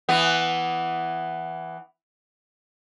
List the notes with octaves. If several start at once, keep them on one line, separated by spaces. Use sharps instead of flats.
E3 B3